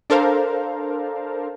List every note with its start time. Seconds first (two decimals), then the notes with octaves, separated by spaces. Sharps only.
0.10 D4 A4 A#4 C5 F5